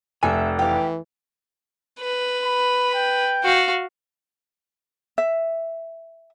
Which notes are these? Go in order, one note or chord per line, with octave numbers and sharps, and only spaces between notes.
F1 E5 G#5
E3 G4 F5
B4
B5
G5
F#4 F5
E5